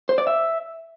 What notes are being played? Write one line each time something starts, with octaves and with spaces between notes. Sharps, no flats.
C5
D5
E5